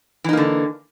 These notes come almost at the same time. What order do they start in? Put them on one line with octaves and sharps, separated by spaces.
E3 D#4 A#3 D3